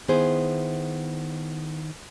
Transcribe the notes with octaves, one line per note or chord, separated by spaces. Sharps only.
D#3 B3 E4 G#4 C5